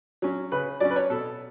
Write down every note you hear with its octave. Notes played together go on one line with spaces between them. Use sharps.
F#3 C#4
C#3 B4
F#3 C#4 D5
B4
C#5
B2 A4